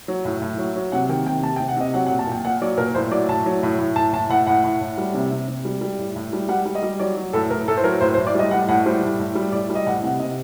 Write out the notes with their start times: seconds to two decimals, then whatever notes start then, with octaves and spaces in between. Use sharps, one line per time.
0.08 F#3
0.25 A2
0.42 A2
0.58 F#3
0.76 F#3
0.92 C3 F#5
1.09 D#3 G5
1.26 C3 G5
1.43 C3 A5
1.56 G5
1.60 C3
1.68 F#5
1.76 C3 D#5
1.94 F#3 F#5
2.07 F#5
2.11 A#2
2.19 A5
2.27 A#2 G5
2.44 A#2 F#5
2.62 F#3 D5
2.78 A#2 A#4
2.95 A2 C5
3.11 F#3 D5
3.29 A2 A5
3.46 F#3
3.63 A2
3.79 A2
3.96 A2 A5
4.13 A2 A5
4.30 A2 F#5
4.47 A2 F#5
4.64 A2
4.81 A2
4.98 G3
5.14 C3
5.31 C3
5.48 C3
5.65 G3
5.81 G3
5.99 A2
6.16 A2
6.33 G3
6.49 G3 F#5
6.65 G3
6.75 D#5
6.82 G3
6.99 F#3 D5
7.17 F#3
7.33 A2 A4
7.51 A2 A#4
7.68 A2 A4
7.77 C5
7.84 F#3 A#4
8.01 A2 C5
8.14 C5
8.18 A2
8.27 D5
8.35 G3 D#5
8.51 A2 F#5
8.68 A2 F#5
8.86 G3 C5
9.02 A2
9.19 A2
9.35 G3
9.52 A2 D5
9.70 G3
9.75 D#5
9.86 A2 F#5
10.03 C3 F#5
10.20 C3 D#5